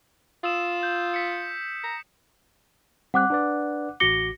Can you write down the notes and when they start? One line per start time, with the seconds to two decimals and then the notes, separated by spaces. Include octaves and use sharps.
0.44 F4 D#6 E6 E7
0.83 G6
1.14 B6 C#7
1.84 A#5
3.14 G3 C4 F#5 D6 F#6
3.30 D4 B4 D5
4.00 A1 F#4 D6 A#6 C#7 G7